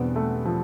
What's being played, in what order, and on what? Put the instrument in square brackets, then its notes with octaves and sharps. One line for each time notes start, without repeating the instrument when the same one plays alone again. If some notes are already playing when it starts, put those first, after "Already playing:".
Already playing: [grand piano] E2 B2 G3 D4 [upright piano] B3 C4
[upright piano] A3
F3